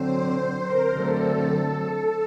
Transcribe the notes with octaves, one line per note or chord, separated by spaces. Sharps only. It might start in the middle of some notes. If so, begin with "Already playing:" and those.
Already playing: D3 F#3 C4 C5
A#4
D3 F#3 A3 C4 A4